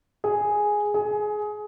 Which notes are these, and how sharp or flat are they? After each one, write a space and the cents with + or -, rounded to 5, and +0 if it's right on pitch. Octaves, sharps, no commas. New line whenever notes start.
G#4 +0
G#4 +20